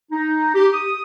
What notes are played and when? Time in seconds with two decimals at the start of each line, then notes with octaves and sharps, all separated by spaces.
0.12 D#4
0.55 G4
0.74 D#6